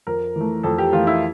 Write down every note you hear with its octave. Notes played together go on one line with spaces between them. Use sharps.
F2 A#4
E3 A3
F2 A4
G4
E3 A3 F4
E4